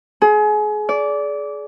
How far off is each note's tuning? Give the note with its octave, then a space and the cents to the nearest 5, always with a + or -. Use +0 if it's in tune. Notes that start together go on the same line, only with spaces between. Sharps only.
G#4 +30
D5 -20